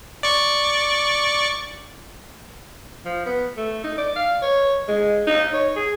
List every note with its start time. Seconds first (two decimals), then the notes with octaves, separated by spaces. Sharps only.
0.23 D5 C#6
3.05 F3
3.26 B3
3.56 A3
3.84 D#4
3.98 D5
4.16 F5
4.42 C#5
4.88 G#3
5.27 D#4
5.53 C#5
5.76 G#4